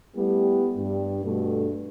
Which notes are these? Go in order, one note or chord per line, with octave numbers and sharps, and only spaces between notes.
G3 A3 B3 E4 G4
G2 G3
G2 B2 A3